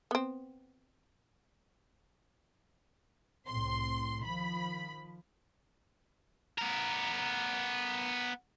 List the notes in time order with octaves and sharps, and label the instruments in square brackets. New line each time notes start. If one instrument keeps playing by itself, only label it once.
[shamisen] B3 C4
[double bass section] C2 A2 C4 [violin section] C6
[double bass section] D#3 F3 [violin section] B5
[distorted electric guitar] B3 A#4